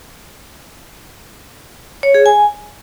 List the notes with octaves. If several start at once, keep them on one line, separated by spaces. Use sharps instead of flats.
C#5
G#4
G#5